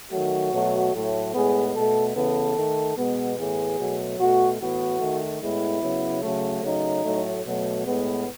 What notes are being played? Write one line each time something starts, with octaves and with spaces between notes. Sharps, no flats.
D#3 F#3 A3 F#4
B2 F#3 A3
A2 F#3 A3
A2 G#3 B3 G#4
B2 A3 A4
C#3 E3 B3 A4
D#3 A3
B2 G#3 B3
A2 E3 B3 G#4
B2 F#3 A3
B2 A3 F#4
A2 E3 B3 F#4
D#3 A3
A2 G#3 B3 E4
C#3 F#3 B3
C#3 F#3 A3
C#3 F#3 A3 D#4
A2 F#3 A3
B2 F#3 A3
A2 G#3 B3